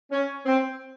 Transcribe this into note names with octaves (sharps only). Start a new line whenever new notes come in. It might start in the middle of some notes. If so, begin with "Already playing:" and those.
C#4
C4